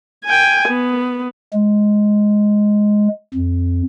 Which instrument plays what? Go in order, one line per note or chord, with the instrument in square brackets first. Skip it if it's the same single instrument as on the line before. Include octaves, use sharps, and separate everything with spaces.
[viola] G5 G#5
B3
[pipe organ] G#3
F2